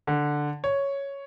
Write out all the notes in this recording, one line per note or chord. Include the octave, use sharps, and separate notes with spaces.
D3
C#5